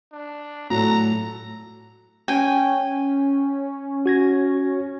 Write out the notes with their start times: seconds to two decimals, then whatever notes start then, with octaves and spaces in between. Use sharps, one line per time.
0.12 D4
0.70 A2 F#3 A4 A#5
2.28 C#4 G5 G#5
4.06 F#4 G#6 A#6